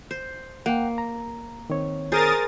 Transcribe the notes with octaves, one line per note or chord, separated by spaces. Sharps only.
C5
A#3 F#5 G5
A#5
D#3 C4 C#5
G#4 A#4 C5 D#6 A6